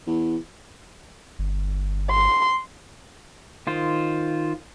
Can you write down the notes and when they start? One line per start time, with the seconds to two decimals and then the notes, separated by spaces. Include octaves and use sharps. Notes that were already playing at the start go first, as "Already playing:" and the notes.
0.07 E2
1.39 G1
2.11 C6
3.67 D#3 F4 C5